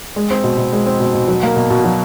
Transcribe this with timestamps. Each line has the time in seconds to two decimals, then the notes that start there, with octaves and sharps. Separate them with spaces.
0.16 G#3
0.31 C4
0.44 B2
0.58 B2
0.73 G#3
0.86 C4
1.00 B2
1.14 B2
1.28 F#3
1.43 A#3
1.56 B2
1.70 B2
1.84 F#3